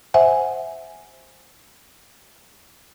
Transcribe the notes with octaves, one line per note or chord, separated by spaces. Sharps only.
C5 E5 F#5 G#5